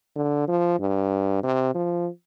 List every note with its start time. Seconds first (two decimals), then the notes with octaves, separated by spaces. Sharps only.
0.16 D3
0.48 F3
0.79 G2
1.43 C3
1.74 F3